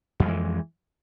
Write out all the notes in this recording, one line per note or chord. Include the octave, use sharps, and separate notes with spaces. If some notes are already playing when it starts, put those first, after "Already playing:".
F2 E3 F3 G#3